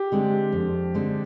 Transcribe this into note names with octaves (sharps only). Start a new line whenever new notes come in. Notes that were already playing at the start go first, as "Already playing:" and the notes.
Already playing: G4
D3 G#3 C4
F2
D3 G#3 C4